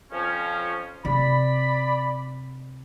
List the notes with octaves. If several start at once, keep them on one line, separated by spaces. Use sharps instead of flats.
F2 F3 C#4
C3 D5 B5